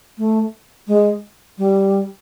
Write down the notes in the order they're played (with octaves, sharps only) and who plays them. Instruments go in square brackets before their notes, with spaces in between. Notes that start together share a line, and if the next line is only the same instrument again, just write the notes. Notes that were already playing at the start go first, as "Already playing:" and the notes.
[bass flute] A3
G#3
G3